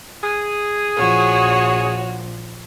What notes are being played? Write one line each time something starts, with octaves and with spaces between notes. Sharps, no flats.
G#4
A#1 F3 F#4 C#5